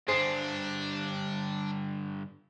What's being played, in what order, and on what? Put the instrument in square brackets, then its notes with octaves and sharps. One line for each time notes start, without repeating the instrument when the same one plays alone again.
[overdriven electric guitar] G2 D3 [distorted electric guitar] D4 [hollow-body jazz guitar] G#4 C5